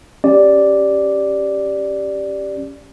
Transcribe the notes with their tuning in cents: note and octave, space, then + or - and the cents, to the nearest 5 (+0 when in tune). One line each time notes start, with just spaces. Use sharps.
C#4 +0 G4 +0 D5 +0